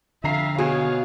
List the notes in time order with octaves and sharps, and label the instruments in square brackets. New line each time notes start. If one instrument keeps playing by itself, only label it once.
[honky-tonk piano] F2 A#5 C7 [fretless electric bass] D3 [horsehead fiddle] E5 F5
[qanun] B2 [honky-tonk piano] G#4 [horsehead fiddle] C#5 F5